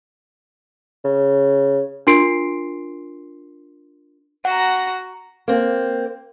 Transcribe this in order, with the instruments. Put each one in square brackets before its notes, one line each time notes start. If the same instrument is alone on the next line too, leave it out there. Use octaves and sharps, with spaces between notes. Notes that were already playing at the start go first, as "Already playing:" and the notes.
[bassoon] C#3
[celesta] D4 F4 A#4 C6 C7 D7
[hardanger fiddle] F#4 A#5 [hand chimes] F#5
[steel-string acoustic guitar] A#3 C4